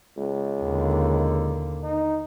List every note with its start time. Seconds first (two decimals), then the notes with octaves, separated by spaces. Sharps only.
0.17 C#2
0.62 D#2 D3
1.83 D#4